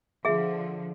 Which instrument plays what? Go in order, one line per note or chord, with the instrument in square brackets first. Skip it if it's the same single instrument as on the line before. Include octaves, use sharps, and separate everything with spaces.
[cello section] D3 F3 [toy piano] G#4 E5